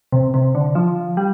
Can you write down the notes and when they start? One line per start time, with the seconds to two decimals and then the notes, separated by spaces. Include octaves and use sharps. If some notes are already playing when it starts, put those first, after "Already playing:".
0.12 C3
0.34 C3
0.55 D3
0.75 F3
1.17 G3